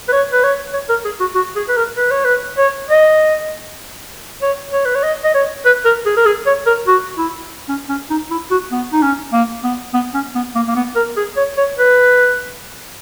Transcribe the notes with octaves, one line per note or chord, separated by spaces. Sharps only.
B4
C#5
B4
C#5
C#5
A#4
G#4
F#4
F#4
G#4
B4
A#4
B4
C#5
B4
C#5
D#5
C#5
C#5
B4
C#5
D#5
D#5
C#5
B4
A#4
G#4
A#4
G#4
C#5
A#4
F#4
E4
C#4
C#4
D#4
E4
F#4
B3
D#4
C#4
A#3
B3
B3
C#4
B3
A#3
A#3
B3
A#4
G#4
C#5
C#5
B4